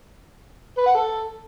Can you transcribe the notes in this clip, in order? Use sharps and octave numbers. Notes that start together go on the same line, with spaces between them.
B4
F#5
A4